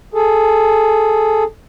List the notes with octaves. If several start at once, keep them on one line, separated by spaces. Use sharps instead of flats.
G#4 A4